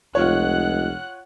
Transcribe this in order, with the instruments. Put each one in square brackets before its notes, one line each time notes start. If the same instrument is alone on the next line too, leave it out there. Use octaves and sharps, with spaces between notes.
[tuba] F1 [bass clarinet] C#2 [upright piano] F4 C#5 [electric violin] F#5 F#6